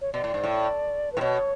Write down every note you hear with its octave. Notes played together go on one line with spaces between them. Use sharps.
C#5
B2 D5
A2
G#2
A2
B4
A2
B2 C#5